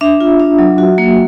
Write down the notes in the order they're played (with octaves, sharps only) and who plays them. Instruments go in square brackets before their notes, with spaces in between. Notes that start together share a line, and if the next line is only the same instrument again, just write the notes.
[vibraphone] D4 E5
F4
D4
F#3
F#4
A#3